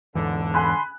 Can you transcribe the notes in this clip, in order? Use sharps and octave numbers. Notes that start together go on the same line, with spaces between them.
E2 G#2 D3 E3
G#5 B5 C6 F#6